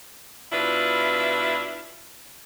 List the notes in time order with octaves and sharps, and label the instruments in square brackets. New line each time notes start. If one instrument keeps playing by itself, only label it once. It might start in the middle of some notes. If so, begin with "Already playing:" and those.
[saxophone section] B2 D4 E4 F4 B4